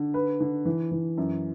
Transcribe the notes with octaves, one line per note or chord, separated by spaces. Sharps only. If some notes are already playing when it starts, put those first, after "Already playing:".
Already playing: D3
B4
D3
E3
E3
F#2